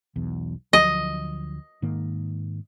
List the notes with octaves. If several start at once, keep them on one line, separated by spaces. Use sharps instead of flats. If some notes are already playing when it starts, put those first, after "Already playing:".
B1 E2
D2 F3 F#3 D#5
G#2 D#3 A#3